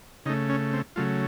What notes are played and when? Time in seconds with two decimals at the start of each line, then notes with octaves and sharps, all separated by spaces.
0.26 C#3 D#4
0.29 A3
0.49 C#4
0.73 C4
0.96 C#3 F#3 A3 F4